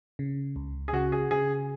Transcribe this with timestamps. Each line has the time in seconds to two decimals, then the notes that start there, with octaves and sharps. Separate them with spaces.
0.19 C#3
0.56 C#2
0.88 G#4
0.93 C#3 F#4
1.12 G#4
1.31 C#3 G#4